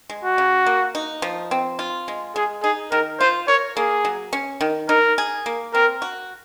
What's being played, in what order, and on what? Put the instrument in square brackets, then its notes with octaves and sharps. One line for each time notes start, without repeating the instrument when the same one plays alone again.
[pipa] G#3
[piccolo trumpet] F#4
[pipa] C#3
A#3
D#4
F3
C4
F4
G#3
[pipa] G#3 [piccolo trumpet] G#4
[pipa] D#4 [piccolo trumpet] G#4
[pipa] D#3 [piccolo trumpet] A#4
[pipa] F4 [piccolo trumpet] C5
[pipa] A#4 [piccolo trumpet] C#5
[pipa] A#3 [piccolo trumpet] G#4
[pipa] F#3
C#4
D#3
[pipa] D#4 [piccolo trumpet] A#4
[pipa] G#4
A#3
[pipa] C4 [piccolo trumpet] A#4
[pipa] F#4